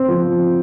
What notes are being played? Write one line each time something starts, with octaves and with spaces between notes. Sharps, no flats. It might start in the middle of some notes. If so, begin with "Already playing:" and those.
Already playing: C4
F3